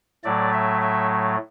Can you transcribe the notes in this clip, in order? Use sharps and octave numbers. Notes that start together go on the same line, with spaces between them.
A2 F#3 A3 D5
E5
E5